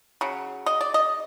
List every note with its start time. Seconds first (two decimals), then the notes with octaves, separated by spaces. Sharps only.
0.21 C#3 F#3
0.66 D#5
0.81 D5
0.94 D#5